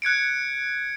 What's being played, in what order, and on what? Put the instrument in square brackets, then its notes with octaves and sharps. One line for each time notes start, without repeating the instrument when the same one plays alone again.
[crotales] F#6 G#6 C#7 D7